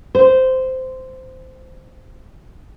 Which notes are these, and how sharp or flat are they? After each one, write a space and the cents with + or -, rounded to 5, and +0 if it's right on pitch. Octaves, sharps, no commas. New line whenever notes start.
C5 -10